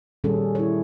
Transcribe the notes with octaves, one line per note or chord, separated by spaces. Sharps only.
A#2 D#3 G3 C#4 G#4 A4
E4 C#5